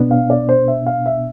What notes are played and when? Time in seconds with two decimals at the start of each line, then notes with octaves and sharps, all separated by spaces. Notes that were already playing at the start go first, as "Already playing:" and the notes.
Already playing: B2 B3 D4
0.11 F5
0.30 D5
0.49 C5
0.68 E5
0.86 F5
1.06 E5